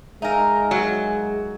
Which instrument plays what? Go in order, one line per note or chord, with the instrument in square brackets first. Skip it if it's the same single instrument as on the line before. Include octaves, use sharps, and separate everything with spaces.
[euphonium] G#3 [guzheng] D#4 A#4 [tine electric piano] E5 F5 G#5
[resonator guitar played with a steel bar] F#3